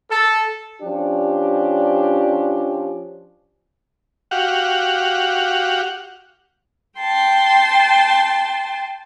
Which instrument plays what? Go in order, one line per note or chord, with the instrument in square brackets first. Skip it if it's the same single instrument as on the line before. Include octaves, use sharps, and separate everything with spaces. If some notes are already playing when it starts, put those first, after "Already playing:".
[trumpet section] A4
[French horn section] F3 C#4 D4 G4
[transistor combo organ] F#4 G4 F5 F#5
[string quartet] G5 A5 C6